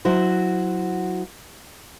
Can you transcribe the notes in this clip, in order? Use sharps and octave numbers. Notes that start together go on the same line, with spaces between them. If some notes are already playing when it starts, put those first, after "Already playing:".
F#3 E4 F#4 C5